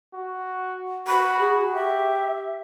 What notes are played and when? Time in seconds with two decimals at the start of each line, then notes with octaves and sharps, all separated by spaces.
0.14 F#4
1.08 F#4 B5
1.40 G#4
1.74 G4 E5